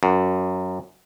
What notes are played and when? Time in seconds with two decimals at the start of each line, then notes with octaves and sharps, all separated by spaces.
0.03 F#2